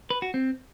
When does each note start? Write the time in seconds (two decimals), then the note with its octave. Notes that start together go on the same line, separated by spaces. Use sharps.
0.10 B4
0.22 F#4
0.34 C4